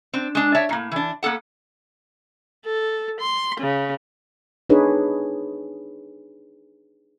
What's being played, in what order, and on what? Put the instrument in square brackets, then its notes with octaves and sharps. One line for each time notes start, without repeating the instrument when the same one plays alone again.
[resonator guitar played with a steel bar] C4 D4
G#3 D4
C#5 D5 E5 A5
A2 A#3
E3 D4
A#3 B3 A4 F#5
[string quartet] A4
C6
C#3
[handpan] D4 D#4 G#4 B4 C#5